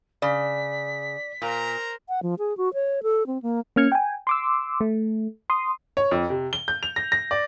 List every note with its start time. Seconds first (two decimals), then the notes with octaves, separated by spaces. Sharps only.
0.22 C#3 D5 B6
1.42 A#2 A#4 C5 A#5
2.09 F#5
2.23 F3
2.39 G#4
2.57 F#4
2.74 C#5
3.03 A4
3.27 C4
3.43 A#3
3.76 A#3 C#4 F6 G#6 C#7
3.92 G5 G#5
4.27 C6 D6 E6
4.81 A3
5.50 C6 D#6
5.97 C#5
6.11 F2
6.30 C3
6.53 G7
6.68 G6
6.83 F7
6.96 A#6
7.12 A#6
7.31 D5